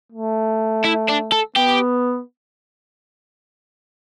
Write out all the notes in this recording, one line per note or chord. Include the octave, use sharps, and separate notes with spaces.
A3
E4
D4
A4
B3 G4